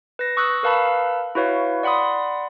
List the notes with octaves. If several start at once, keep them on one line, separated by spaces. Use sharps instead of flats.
B4 A#6
C#6 D#6 E6 F#6
A#4 B4 F5 A5 B5 E6
E4 F#4 B4 C#5 F5
D5 F#5 B5 C6 D#6